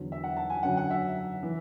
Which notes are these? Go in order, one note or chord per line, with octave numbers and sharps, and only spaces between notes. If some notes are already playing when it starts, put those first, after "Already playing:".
Already playing: E2 D3 F#3
E5
F#5
A5
G#5
F#2 D3 F#3 F#5
F#5
E5
E3